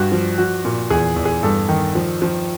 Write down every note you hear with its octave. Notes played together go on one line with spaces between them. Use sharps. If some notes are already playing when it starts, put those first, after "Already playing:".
Already playing: G2 F#4
F3
F3 F#4
A#2
E2 G#4
E2
G#4
G2 A4
D#3
F3
F3